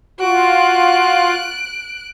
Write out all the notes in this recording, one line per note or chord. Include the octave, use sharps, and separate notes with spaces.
F4 F#4 F#6 D7